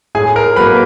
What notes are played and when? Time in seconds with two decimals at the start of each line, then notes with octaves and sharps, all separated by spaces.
0.15 A2 G#4 G#5
0.36 A#4 A#5
0.56 F#3 A#3 B4 B5